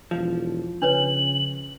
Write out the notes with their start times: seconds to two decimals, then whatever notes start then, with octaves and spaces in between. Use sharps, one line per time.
0.11 E1 F3
0.82 C#3 D4 B4 C#5 F#7